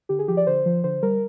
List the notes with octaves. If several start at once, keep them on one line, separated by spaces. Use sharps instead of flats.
D3 G4
G#4
F3 G4
D5
D3 C5
F3
D3 C5
G3 A#4